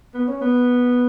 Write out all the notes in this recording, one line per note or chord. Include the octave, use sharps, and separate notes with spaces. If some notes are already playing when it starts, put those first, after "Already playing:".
B3
C#4
B3